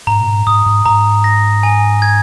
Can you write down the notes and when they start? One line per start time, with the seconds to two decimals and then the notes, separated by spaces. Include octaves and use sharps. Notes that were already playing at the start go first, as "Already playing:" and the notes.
0.07 G#2 A#5
0.21 A#2
0.27 G#2
0.47 G#2 D#6
0.66 G#2
0.85 G#2 A#5
1.24 A#6
1.63 G#5
2.02 G#6